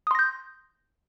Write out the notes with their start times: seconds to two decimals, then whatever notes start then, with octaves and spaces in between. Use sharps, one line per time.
0.07 D#6
0.11 C6
0.15 A#6
0.19 G6